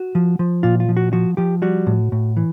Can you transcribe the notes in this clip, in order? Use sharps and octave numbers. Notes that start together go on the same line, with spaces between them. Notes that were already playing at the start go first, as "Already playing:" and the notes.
Already playing: F#4
F3
F3
A#2 F4
F4
F3
F#4
F3 F#4
F3 G4
G3 F#4
A2
A2
E3